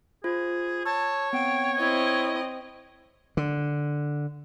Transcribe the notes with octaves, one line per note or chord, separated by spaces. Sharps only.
F4 G#4 C5
C#5 A5 E6
B3 C4 F#5 G5
C4 E4 D#5 G#6
D3